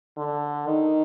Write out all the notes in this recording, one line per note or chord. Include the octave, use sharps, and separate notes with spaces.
D3
D#3